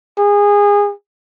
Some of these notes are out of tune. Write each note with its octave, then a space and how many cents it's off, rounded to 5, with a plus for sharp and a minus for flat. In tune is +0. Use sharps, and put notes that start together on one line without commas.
G#4 -25